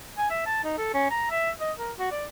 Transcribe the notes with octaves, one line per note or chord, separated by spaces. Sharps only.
G#5
E5
A5
D#4
A4
C#4
A#5
E5
D#5
A#4
F#4
D5